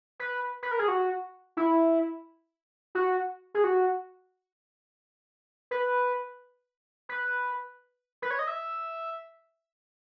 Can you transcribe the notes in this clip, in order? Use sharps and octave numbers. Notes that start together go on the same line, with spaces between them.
B4
B4
A#4
G#4
F#4
E4
F#4
G#4
F#4
B4
B4
B4
C#5
D#5
E5